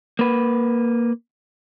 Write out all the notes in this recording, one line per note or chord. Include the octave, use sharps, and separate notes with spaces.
A#3 B4